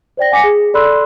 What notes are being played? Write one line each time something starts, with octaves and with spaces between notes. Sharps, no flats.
C5 D5 G5 A#6
F#5 G#5 D6 A#6 B6 C#7
G#4
A4 D5 B5 C6 E6 F#6